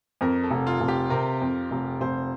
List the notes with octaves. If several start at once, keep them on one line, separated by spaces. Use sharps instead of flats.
F2 A#4
A4
F1
F4
F1
G4
C3 A#4
F2
F1
F1 C5